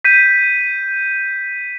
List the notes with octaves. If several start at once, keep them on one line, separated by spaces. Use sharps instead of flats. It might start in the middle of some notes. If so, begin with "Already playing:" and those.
G6 B6 D#7